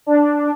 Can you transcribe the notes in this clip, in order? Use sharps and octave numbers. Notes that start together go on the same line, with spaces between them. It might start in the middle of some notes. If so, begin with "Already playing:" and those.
D4